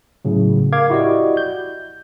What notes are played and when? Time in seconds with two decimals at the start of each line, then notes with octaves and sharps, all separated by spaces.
0.25 A2 C#3 F#3
0.72 A#4 F5 D6 G#6
0.90 E4 F#4 G4 D5 D#5
1.37 G6